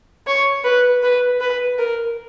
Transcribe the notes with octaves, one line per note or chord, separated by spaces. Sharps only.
C#5
B4
B4
B4
A#4